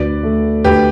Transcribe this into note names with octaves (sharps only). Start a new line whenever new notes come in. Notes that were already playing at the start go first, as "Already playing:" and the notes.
Already playing: D2 B4 D5
A3
D2 G4 B4